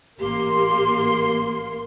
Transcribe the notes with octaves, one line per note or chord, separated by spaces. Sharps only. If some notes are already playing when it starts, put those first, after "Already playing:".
A1 A#3 G4 C6